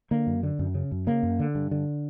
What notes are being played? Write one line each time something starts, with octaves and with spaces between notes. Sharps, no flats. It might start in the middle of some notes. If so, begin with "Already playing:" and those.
D3 A#3
F#2
D3
F#2
C#3
F#2
C#3 A#3
F#2
D3
G2
D3